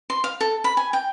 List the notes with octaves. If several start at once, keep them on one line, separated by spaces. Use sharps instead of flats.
C6
F5
A4
B5
G#5
G5